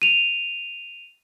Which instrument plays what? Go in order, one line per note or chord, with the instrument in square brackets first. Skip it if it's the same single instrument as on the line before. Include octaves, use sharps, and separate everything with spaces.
[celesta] D#7 F7